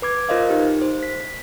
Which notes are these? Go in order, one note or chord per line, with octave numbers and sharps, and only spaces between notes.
B4 D6 G#6
F4 A#4 C5 D#5 F5
D#4 G4
C5
B6